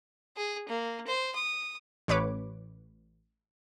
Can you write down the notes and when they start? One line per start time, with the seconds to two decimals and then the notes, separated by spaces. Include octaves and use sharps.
0.37 G#4
0.69 A#3
1.07 C5
1.35 D#6
2.08 A1 B4 C#5 D6